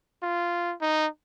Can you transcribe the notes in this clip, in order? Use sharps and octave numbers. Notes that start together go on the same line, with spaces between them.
F4
D#4